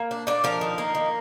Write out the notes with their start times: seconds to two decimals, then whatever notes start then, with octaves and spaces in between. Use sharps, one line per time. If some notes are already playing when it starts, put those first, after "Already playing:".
Already playing: A#3
0.11 D4
0.27 D4 D5
0.44 F3 A#4
0.61 D#3
0.78 A#3
0.95 D#3